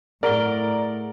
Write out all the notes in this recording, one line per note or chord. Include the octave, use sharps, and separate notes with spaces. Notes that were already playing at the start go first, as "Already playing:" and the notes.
A2 G#4 A#4 D5 F#5 A#5 G7